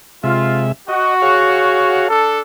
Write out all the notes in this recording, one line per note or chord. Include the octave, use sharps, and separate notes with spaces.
C3 G#3 F4 E5
F#4 D#5
G#4 C#5 F5
D4 A4